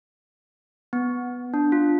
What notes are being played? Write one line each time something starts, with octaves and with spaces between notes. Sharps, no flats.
B3
D4
F4